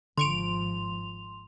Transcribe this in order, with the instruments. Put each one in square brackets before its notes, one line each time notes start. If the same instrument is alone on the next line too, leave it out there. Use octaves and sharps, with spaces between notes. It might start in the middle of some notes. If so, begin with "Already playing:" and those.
[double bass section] G#1 G#2 F3 [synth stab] D3 C#6 D7 [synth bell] C6 F7